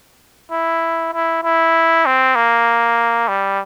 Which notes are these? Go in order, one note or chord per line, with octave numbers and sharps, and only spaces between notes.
E4
E4
E4
C4
A#3
G3